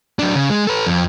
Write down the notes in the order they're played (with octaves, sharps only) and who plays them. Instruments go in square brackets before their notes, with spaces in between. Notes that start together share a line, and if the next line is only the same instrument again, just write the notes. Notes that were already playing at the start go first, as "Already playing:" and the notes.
[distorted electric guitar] F#3 D4
C#3
G#3
A4 B4
F2